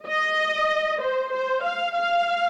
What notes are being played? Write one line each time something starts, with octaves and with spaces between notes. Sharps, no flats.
D#5
C5
C5
F5
F5